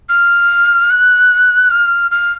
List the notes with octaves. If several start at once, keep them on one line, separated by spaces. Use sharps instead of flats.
F6
F#6
F6
F6